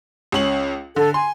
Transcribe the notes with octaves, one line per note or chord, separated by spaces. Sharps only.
C#2 C#4 F#7
D3 A4
G#5 C6